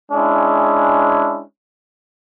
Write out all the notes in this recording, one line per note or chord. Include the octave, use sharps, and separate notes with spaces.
G#3 C#4 D4 E4